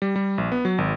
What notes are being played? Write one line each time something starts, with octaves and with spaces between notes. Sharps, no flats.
G3
G3
A#1
B3
F#3
G#1